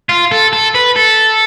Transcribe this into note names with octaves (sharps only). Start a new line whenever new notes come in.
F4
A4
A4
B4
A4